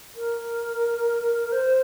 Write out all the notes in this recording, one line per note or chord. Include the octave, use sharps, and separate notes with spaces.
A#4
C5